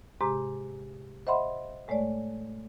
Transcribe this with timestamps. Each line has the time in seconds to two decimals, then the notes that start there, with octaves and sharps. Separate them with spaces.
0.21 G#2 C3 G#3 G4 A#5 D6
1.27 C5 D#5 E5 F#5 B5 C6
1.88 A2 G#3 A3 C#5 D5